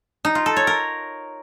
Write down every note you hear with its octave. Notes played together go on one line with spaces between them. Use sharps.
D#4
F4
A4
C#5
A#4